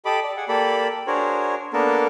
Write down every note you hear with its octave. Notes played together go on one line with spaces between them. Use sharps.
G4 A4 D#5 B5 D6
D5
G#4 F#5
A#3 G4 A4 D5 B5
D4 F#4 G#4 A#4 C5 C#5
A#3 B3 D4 A4 A#4